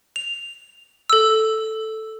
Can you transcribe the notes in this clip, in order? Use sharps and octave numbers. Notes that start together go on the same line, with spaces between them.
F7
A4 E6